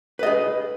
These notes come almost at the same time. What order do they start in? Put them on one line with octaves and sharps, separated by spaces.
B4 D#5 G#4